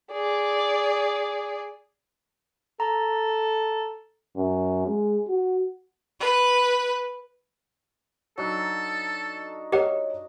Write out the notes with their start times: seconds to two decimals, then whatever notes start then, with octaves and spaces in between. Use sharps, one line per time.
0.13 G#4 D5
2.80 A4 A#5
4.37 F#2
4.88 G#3
5.29 F#4
6.20 B4
8.38 F#3 D4 D#4 A4
9.72 G4 A#4 C#5 D#5 F#5